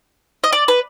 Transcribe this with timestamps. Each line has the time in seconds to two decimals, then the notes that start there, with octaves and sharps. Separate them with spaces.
0.44 D#5
0.53 D5
0.68 B4